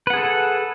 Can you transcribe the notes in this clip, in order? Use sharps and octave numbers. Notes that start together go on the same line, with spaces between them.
G#4 A4 B4 F#5